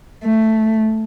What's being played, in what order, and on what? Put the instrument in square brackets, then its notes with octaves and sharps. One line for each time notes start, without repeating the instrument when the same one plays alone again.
[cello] A3